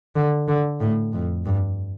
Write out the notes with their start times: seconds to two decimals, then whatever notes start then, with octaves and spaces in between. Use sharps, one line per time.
0.16 D3
0.48 D3
0.80 A2
1.13 F2
1.46 G2